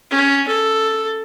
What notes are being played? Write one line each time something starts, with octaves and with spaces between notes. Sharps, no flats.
C#4
A4